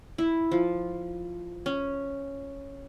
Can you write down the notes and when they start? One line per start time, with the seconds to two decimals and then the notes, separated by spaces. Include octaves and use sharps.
0.18 E4
0.51 F3
1.66 C#4